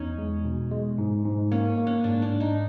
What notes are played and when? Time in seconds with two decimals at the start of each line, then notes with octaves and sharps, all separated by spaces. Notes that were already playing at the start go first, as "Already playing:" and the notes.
Already playing: E2 C#4 D#4
0.18 G#3
0.45 B2
0.72 G#3
0.98 G#2
1.25 G#2
1.51 A#3 C#4
1.78 A#3
1.87 C#4
2.04 G#2 D4
2.22 D4
2.31 G#2
2.40 D#4